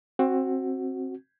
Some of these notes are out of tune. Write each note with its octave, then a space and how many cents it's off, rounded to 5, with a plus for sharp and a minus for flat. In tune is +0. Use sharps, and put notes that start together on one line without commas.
C4 +20 F#4 +0